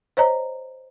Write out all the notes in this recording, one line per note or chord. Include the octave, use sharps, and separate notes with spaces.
C5 C#5 D#5 A#5